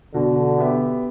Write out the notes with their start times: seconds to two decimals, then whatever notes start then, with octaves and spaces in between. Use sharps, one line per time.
0.14 B2 D3
0.58 B3 G4 E5